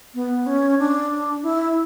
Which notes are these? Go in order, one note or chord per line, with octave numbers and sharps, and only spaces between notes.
B3
C#4
D4
E4